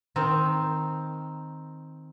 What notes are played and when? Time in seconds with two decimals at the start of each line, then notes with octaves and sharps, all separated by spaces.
0.16 D#3 C4